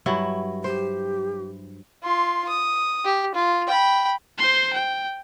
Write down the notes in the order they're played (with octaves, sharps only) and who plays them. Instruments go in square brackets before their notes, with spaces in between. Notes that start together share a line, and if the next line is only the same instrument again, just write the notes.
[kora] G2 F#3 E4
[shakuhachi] G4 [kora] C5
[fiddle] F4 C6
D#6
G4
F4
G5 B5
[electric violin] C5 C6
G5